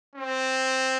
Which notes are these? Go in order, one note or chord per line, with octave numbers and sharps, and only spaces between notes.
C4